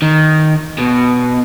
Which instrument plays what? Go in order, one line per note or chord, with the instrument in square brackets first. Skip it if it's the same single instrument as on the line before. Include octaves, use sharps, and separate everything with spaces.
[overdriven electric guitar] D#3
B2